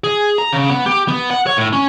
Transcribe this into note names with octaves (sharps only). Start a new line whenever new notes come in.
G#4
A#5
C#3
B3
G4
B3
F#5
C#5
A2
C#4